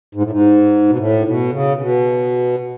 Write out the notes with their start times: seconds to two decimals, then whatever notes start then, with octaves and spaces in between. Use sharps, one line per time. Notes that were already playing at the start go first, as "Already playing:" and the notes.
0.15 G#2
0.23 A2
0.30 G#2
0.89 B2
0.98 A2
1.26 B2
1.53 C#3
1.77 C#3
1.81 B2